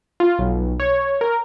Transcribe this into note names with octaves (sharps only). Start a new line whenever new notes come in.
F4
B1
C#5
A#4